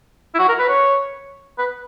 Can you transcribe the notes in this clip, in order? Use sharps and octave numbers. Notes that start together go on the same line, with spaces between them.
E4
F#4
A#4
B4
C#5
B4